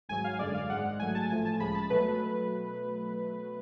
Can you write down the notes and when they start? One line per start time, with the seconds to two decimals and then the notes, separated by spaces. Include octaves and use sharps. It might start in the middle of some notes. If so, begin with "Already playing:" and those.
0.09 G#1 G#2 F#3 G#5
0.24 F5
0.39 F#2 D3 G#3 D5
0.54 F5
0.69 G#1 G#2 G#3 F#5
0.99 A1 G#2 F#3 A3 G#5
1.15 A5
1.30 A1 A2 F3 A3 G#5
1.45 A5
1.60 C#2 C#3 F3 G#3 B5
1.75 A5
1.90 B2 F#3 A3 B4